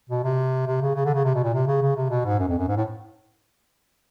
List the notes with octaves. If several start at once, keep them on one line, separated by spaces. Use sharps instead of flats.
B2
C3
C3
C#3
C#3
D3
C#3
C3
B2
A#2
C3
C#3
C#3
C3
B2
G#2
F#2
F2
F#2
G#2
A2